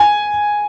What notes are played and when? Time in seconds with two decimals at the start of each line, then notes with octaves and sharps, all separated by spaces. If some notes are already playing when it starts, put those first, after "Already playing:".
Already playing: G#5